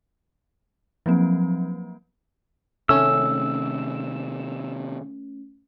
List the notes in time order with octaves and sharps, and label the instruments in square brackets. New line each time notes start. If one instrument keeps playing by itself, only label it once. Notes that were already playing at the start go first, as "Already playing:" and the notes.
[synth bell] F3 F#3 A#3 C4
[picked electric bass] C3 D#3 [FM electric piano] A3 C#4 [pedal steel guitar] E6